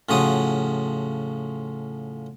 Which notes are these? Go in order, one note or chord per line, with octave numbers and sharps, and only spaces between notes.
A2 C#3 F3 F#4 D#6